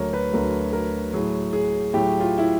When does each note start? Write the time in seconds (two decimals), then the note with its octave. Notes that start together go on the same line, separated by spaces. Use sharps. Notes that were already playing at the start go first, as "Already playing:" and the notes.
Already playing: D2 D3 F#3 A#4 C#5
0.13 B4
0.33 D2 D3 F#3 A#4
0.73 A#4
1.14 A2 F#3 G#4
1.53 G#4
1.94 A2 F#3 G4
2.20 F4
2.38 E4